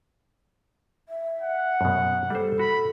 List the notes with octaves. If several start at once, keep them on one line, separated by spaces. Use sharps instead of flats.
E5
F#5
F#2 B2
G3 A4 C5
F#4 B5